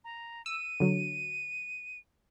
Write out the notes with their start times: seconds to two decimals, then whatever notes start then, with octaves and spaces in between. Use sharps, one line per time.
0.04 A#5
0.46 E6 D#7
0.80 D3 F#3